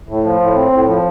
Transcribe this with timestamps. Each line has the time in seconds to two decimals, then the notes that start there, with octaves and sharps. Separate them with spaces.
0.09 A2
0.24 F3
0.41 A2
0.55 C4
0.71 A2
0.87 F3